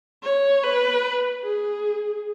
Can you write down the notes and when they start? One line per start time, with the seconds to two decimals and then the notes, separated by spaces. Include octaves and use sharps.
0.23 C#5
0.63 B4
1.44 G#4